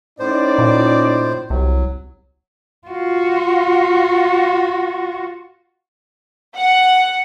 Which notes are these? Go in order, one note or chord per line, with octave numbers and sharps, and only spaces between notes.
A2 C#4 D#4 C5 D5
A#2
C2 F#3
F4 F#4
F#5